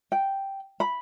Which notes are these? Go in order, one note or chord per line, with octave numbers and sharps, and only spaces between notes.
G5
B5